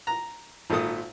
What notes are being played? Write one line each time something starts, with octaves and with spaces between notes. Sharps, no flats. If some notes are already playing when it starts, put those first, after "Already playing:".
A#5
G#1 A#2 A4 D#6